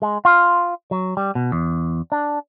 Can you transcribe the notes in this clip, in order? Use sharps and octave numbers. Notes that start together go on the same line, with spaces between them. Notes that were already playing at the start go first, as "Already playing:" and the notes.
G#3
F4
F#3
G3
B2
E2
D4